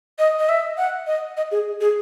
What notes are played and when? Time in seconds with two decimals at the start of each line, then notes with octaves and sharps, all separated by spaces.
0.19 D#5
0.39 D#5
0.49 E5
0.78 F#5
1.07 D#5
1.37 D#5
1.51 G#4
1.81 G#4